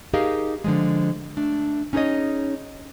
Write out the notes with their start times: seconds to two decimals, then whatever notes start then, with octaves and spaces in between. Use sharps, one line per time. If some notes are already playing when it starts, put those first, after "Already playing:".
0.13 D#4 G4 G#4 A#4 D#5 F5
0.64 D3 F3 G#3
1.37 A3 D4
1.93 C#4 D#4 G#4 A#4 C#5 D#5